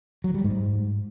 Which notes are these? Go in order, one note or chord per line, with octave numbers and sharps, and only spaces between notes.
F#3
G3
G#2